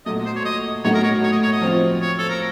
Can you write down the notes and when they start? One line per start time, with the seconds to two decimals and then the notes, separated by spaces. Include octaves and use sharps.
0.06 A#2 F#3 A3 D#5
0.26 C5
0.35 C#5
0.45 D#5
0.84 A2 F#3 A3 D#4 F#4 C#5
0.94 A#4
1.03 C#5
1.23 C#5
1.32 D#5
1.43 C#5
1.53 D#5
1.62 F3 C4 F4
2.01 C#5
2.18 A4
2.30 A#4